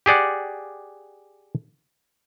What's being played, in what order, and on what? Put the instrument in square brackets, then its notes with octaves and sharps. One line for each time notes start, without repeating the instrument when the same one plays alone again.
[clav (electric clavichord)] G4 G#4 D5 F#5